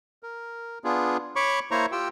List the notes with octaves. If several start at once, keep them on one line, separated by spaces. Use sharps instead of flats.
A#4
B3 D4 F4 G#4
C#5 B5 C#6 D6
A#3 E4 C5 C#5 A#5 C#6
F4 G4 G5 E6